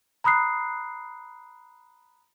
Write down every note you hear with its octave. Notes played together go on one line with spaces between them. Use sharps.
A#5 B5 D#6 F#6 C7